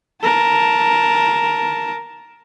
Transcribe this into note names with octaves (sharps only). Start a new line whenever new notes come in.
A#4 A5